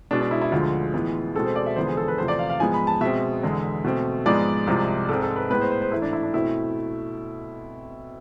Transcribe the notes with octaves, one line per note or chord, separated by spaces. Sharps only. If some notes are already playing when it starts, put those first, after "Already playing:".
B2 G#3 B3 D4
D4
E4
E4
D2 D3 F3 G#3 F4
A2 E3 G#3 B3
B2 G#3 C4 A4
C5
D5
E5
E2 D3 F3 G#3 B3 C5
G#4
A4
B4
E2 C3 F3 A3 C5
D5
F5
F5
G#2 F3 G#3 B3 G#5
B5
A5
B2 G#3 C4 E5
E2 D3 G#3
B2 A3 C4
G#2 F3 G#3 B3 D5
C2 C3 F3 G#3
G#2 G#3 C4 A4
A4
B4
A2 G#3 B3 B4
C5
C5
C5
G#2 E3 A3 E4
D4
E4
D4
B2 A3 C4 E4